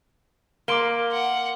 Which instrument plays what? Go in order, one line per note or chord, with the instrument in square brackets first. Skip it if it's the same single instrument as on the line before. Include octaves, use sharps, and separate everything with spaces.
[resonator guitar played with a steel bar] A#3 [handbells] A#4 D6 [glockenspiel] C6 D7 G7
[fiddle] F#5